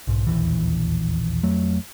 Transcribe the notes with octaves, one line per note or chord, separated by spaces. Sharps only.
B1 G#2
E1 A#1 D#2 E3
F2 F#3 A3